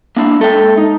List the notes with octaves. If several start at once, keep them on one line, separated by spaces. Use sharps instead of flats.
A#3 D4 E4 F5
G#3 A4 E5 G5
D#4